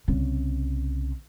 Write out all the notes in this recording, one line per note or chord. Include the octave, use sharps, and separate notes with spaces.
C2 C#3